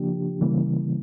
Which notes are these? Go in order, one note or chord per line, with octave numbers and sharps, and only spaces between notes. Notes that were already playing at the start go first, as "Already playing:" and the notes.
Already playing: C#3 F3 A#3 D4 G4
C#3 E3 G3 A#3